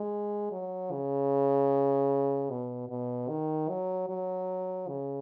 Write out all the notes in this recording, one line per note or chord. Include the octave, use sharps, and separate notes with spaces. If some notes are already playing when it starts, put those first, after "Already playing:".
Already playing: G#3
F#3
C#3
B2
B2
D#3
F#3
F#3
C#3